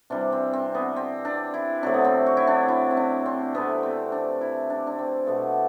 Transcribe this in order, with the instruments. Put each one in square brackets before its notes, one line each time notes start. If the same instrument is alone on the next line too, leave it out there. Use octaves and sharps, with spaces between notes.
[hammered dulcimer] C3 E3 G3 D4
C4
C4
B3
C4
D4
E4
C3 F#3 A3 D4
B3
C4
F#4
E4
D4
E4
C4
D4
C4
C3 E3 A3 B3
C4
D4
E4
D4
D4
C4
B2 A3 B3